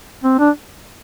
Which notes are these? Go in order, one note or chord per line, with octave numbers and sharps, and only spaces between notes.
C4
D4